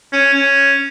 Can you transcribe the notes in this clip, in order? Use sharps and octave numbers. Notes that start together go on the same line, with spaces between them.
C#4
C#4